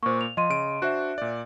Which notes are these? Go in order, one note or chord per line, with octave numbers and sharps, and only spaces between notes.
A#2 A#3 C5 C#6
F7
F3 D#5 C6 D#7
C#3 D7
D4 F#4 C5 E5 F#6
A#2 D5